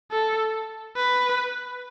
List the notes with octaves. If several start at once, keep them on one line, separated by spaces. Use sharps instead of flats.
A4
B4